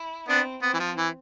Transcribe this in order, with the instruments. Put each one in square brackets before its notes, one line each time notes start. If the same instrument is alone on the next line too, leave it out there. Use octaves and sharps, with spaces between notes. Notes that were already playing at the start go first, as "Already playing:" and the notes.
Already playing: [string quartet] E4
[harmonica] B3 D4 [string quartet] C4
[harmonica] B3 [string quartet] C4
[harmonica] E3
F3
E3